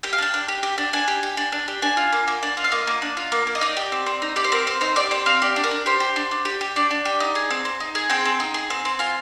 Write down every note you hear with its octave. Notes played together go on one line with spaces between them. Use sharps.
G4 G5
F5
D4 G5
D4
G4
G4
D4
D4 G#5
G4
G4
D4
D4
G4
D4 G#5
F4
A#3
A#3
D4
F4
F5
A#3 D#5
A#3
D4
F4
A#3
A#3
D#5
D#4 D5
G4
C4
C4
D#4
G4 D5
C5
C4 A#4
C4 C5
D#4 C5
G4 D5
C4 G5
C4 F5
G4 D5
D4
A#4
D4
G4 C5
G4
D4
D4
G4
G4
D4 D5
D4
G4
D#4
G#4
C4
C4
D#4
G#4
C4 G5
C4
D#4
G#4
C4
C4
F4 G#5